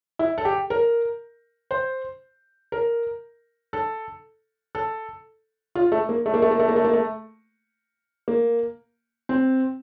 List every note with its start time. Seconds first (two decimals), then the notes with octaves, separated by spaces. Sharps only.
0.19 E4
0.38 A4
0.45 G4
0.70 A#4
1.71 C5
2.72 A#4
3.73 A4
4.75 A4
5.75 F4
5.92 A3
6.09 A#3
6.26 A3
6.34 A#3
6.42 A3
6.51 A#3
6.60 A3
6.68 A#3
6.76 A3
6.85 A#3
6.93 A3
8.28 A#3
9.29 C4